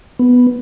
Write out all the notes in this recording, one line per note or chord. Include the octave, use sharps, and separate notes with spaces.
B3